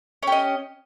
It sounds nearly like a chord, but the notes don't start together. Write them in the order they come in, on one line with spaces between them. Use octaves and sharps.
C#4 G4 D#5